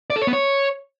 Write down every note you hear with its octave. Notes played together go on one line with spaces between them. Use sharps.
D5
A4
C#5
B3
C#5